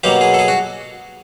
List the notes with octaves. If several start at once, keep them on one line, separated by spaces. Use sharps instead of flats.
B2 F#3 A#3 G4
G#4
A4
G#4
F#4